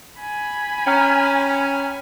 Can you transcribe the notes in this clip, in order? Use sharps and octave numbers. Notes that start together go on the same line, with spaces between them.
G#5 B5
C#4 G5 A#5 F6